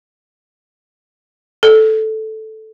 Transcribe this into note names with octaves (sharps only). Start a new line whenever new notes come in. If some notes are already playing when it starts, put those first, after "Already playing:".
A4